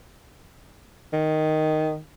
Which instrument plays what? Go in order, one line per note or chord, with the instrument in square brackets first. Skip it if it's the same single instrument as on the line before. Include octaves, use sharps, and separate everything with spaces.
[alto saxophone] D#3